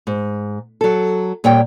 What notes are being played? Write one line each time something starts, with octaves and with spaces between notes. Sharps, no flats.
G#2
F#3 A4
A#2 G3 C#5 F#5 G5